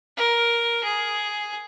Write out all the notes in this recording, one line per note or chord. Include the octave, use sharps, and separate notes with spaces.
A#4
G#4